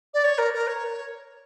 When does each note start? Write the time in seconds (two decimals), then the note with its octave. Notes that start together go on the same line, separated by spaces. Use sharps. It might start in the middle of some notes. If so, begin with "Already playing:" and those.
0.14 D5
0.24 C#5
0.38 A#4
0.53 A#4
0.67 C#5